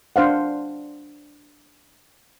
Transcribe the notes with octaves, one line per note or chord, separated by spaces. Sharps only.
D4 C5 F5 F#5